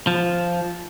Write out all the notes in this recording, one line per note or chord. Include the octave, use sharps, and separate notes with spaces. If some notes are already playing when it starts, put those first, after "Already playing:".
F3